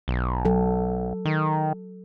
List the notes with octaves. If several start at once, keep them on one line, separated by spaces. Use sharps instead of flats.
B1
F#3 A4
D#3